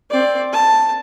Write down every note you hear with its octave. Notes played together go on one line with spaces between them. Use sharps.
C4 D5
A5